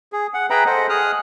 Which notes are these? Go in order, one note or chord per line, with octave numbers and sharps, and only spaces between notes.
G#4
F#5
G#4 B4 E5 G5 A#5 B5
A4 C5 D#5 F#5
G#4 D#6 F6 F#6